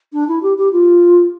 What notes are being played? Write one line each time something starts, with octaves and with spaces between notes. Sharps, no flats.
D4
E4
G4
G4
F4